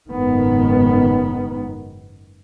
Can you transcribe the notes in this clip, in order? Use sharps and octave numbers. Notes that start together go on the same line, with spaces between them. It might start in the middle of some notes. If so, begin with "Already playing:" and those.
F#1 G#2 D#3 B3